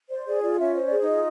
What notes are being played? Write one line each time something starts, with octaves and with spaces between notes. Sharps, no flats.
C5 D5
G#4 D5
F4 D5
C#4 E5
C5 D#5
G#4 D5
D#4 D#5
F4